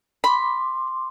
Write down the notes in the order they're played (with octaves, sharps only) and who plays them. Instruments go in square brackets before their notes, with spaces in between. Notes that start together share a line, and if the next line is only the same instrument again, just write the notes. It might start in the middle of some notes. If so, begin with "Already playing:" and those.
[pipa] B5 [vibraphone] C6 D6